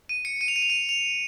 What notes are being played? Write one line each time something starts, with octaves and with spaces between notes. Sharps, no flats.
D#7
C#7
D#7
F7
D#7
F7
D#7
F7